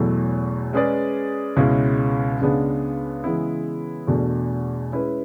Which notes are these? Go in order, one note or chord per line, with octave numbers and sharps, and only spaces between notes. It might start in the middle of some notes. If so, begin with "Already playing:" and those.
Already playing: E2 B2 F#3 A3 E4
G#3 C#4 G#4 B4 D5
C#2 B2 G#3 C#4 E4
C#2 C#3 G#3 B3 D4
C#3 E3 G#3 B3 E4
E2 B2 A3 D4 F#4
G#3 C#4 E4 B4